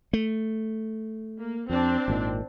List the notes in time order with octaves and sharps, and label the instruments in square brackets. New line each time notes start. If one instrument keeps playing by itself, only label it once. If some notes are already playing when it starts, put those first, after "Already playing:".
[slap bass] A3
[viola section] A#3
[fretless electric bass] F2 [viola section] C4 D4
[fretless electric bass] G#1 A#2 D#3